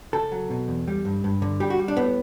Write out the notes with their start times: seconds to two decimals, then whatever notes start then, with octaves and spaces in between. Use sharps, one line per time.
0.13 C#3 A4
0.32 F#3
0.50 B2
0.68 E2
0.88 G3
1.05 G2
1.24 G2
1.42 D3
1.60 G3 G4
1.70 F#4
1.79 G3
1.88 D4
1.97 A2 B3